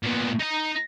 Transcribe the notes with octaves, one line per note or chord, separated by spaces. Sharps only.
A#2 B3
D#4 A#5